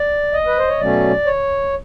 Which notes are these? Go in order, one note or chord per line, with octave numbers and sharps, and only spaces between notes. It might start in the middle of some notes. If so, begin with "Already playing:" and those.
Already playing: D5
D#5
B4
C5
C#5
B2 F#3 A3 C#4 D5
C#5